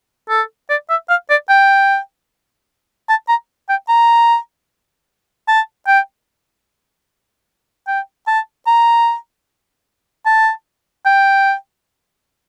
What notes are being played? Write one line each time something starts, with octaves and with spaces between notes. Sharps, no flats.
A4
D5
E5
F5
D5
G5
A5
A#5
G5
A#5
A5
G5
G5
A5
A#5
A5
G5